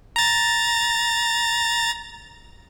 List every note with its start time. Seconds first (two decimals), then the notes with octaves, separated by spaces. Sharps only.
0.16 A#5 A6